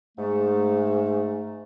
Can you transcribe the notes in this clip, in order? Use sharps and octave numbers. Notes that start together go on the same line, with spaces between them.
G#2 A3